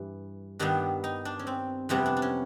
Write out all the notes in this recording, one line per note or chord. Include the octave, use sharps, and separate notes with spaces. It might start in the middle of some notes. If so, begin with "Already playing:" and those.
Already playing: G2 E3
G2 D#3 G3 B3 D4
D#4
D4
C#4
C4
F2 C3 E3 G3 B3 D4
D4
D4
C#4